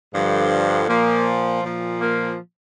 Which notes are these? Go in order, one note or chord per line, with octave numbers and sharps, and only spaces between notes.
G2 D3 F3
A#2 F3 A#3
A#2 F3
A#3